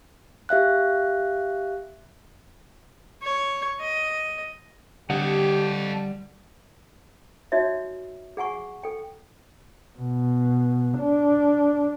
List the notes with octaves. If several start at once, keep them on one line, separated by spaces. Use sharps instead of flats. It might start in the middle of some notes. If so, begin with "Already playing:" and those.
G4 E5 F5 F#6
C#5
D#5
D3 G3 G4 A4 D#5 F#5
D#4 F#4 C#5 D#5 E5
G#4 F#5 G#5 C#6
A4 G5
B2
D4